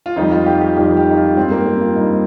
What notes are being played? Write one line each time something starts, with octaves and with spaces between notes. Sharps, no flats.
F4
F2 D#3 G3 D#4
F4
G4
G4
F2 D#3 G3 G4
G4
D#4
F4
G2 G3 C4
A#3
C4
F4
G2 G3 D#4